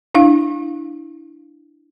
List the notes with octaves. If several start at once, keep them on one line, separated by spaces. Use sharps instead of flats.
D4 E4 F5